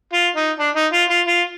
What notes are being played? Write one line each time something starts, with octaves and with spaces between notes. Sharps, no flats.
F4
D#4
D4
D#4
F4
F4
F4